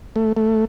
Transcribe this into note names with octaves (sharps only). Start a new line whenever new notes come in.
A3
A3